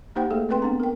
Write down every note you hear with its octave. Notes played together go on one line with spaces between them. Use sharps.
A#3 D#4 G4 C5 F#5 G5
A3 A#3 G#4 A4
A3 C4 B4 G5 C6
B3 C4 D4 A#5
A#4 G5